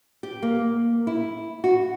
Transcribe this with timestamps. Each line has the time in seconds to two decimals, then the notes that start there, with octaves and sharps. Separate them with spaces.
0.23 G4
0.43 A#3
1.07 E4
1.64 F#4